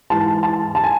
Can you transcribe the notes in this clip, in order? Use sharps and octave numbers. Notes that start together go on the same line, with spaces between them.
G#2 E3 A5
A5
A5
G#5